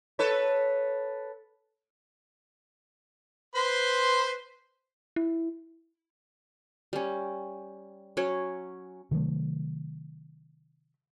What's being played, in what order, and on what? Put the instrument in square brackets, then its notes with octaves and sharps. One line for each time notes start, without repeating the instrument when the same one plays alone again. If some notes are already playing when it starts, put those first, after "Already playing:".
[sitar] A4 B4 C#5
[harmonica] B4 C5 C6
[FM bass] E4
[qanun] G3 C#4
F#3 C#4 C#5
[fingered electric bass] C3 D#3 F#3 A3